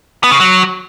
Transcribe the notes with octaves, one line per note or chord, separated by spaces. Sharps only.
B3
C#3
F#3